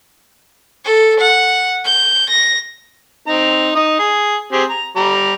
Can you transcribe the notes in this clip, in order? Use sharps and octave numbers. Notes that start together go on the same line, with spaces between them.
A4
F#5
G6
A#6
C4 D#4 A#5
D#4 D#6
G#4
C4 G4 G#4
A#5
G3 A#5